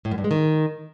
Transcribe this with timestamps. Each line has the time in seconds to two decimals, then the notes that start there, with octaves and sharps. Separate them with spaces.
0.05 A2
0.11 F#2
0.18 G2
0.24 G#3
0.31 D#3